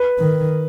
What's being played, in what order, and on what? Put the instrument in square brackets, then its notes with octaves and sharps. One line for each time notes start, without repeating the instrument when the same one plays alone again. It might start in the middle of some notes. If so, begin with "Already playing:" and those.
Already playing: [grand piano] B4
[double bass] D#3